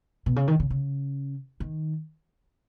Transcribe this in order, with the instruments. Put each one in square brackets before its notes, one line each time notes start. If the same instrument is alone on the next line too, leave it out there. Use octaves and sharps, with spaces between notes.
[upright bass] B2
C#3
D#3
C#3
C#3
D#3